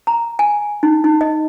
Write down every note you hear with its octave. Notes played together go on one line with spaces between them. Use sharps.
A#5
G#5
D#4
D#4
D#5